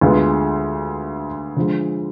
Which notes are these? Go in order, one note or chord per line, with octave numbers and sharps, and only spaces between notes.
D2 D3 G#3 B3 F4
D3 F3 G#3